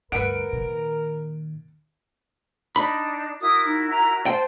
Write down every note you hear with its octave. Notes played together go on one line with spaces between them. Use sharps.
D2 G2 A#4 B4 E5 F#5 D7
A#2 D#3
D4 D#4 B5
E4 F#4 A#4 D#6
D#4
A#5
C5 G5 A5 C6